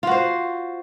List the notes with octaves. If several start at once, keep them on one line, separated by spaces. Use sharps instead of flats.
F4 F#4 C5